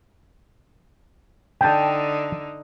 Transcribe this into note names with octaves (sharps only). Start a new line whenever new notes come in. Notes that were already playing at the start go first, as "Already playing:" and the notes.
D3 D#4 G5 A5